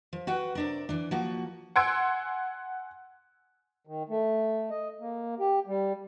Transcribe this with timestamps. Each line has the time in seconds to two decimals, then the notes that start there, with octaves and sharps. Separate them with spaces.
0.13 F3
0.27 F#4 B4 F#5 G5
0.55 C3 D4 A#4
0.89 E3 D4
1.11 F3 A#3 F#4
1.76 F#5 G#5 C6 E6 G#6 D7
3.87 D#3
4.09 A3
4.70 D#5
5.00 A#3
5.40 G4
5.67 G3